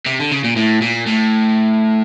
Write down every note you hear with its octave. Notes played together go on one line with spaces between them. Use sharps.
C3
D3
C#3
A#2
A2
A#2
A2